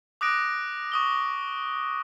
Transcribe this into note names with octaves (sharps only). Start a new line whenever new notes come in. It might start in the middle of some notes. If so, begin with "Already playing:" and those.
D6 D#6 F#6 A#6 D7
C#6 D#6 G7